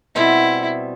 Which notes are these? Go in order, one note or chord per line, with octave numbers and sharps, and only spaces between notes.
B2 G3 C4 E4